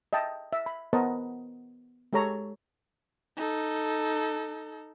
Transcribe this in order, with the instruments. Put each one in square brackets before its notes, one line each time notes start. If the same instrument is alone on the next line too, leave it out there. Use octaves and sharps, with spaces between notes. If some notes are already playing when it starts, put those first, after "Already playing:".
[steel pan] D#5 E5 G5 A5
E5
B5
B3 A#4 C5 D#5 F#5 A5
G#3 G4 A4 C#5 A#5
[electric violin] D#4 A4